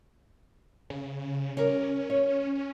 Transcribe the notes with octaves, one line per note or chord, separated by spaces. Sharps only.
C#3
G3 C#4 A#4 C#5
C#5